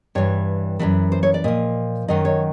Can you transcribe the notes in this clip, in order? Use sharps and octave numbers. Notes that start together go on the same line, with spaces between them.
G2 E3 C#5
F#2 C#3 E3 B4
C5
C#5
D5
A#2 F3 D#5
F#2 D#3 F#3 D#5
C#5